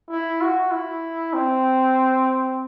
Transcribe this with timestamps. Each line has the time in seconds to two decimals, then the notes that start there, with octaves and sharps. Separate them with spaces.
0.10 E4
0.41 F#4
0.71 E4
1.34 C4